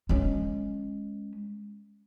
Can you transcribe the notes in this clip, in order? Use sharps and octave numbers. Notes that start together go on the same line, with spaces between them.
G#3 C#4